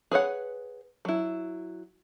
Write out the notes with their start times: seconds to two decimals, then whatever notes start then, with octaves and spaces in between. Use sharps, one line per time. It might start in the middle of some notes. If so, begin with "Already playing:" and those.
0.12 G#4 B4 C#5 F#5
1.05 F#3 E4